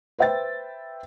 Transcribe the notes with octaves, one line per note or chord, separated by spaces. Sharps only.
B4 C5 E5 G5 A6